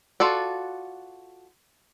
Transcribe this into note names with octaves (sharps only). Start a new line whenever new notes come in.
F4 F#4 A4 D5